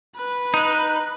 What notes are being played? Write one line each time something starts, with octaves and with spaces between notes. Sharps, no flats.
B4
D#4